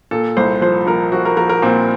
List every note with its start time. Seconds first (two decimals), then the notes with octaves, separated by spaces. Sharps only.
0.11 A#2 A4
0.37 C2 C5
0.61 F3 C5
0.87 F3 A#4
1.12 F3 F#4
1.25 A#4
1.37 F3 A#4
1.49 A#4
1.62 A#2 C4